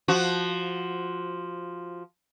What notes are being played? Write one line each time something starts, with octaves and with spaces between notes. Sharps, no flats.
F3 F#4